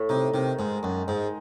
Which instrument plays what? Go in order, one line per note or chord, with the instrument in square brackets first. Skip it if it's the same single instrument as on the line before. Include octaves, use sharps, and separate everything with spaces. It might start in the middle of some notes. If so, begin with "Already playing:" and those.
Already playing: [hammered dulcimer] A2
[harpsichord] C3 [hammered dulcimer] D#4
[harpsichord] C3 [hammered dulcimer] D#3
[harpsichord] G#2 [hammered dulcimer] G#3
[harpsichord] F#2 [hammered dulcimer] G#3
[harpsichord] G#2 [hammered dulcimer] D#4